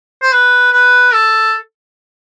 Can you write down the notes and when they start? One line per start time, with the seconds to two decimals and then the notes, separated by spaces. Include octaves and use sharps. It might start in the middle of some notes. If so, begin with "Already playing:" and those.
0.22 C5
0.33 B4
0.73 B4
1.13 A4